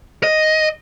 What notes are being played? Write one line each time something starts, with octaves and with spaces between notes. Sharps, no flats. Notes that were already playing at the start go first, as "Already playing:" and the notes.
D#5